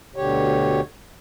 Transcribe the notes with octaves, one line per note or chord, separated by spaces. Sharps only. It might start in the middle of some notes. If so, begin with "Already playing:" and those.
D2 B2 D3 G4 C#5